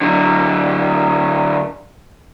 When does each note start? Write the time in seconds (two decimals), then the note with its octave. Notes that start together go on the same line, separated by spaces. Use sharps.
0.01 D3 F#3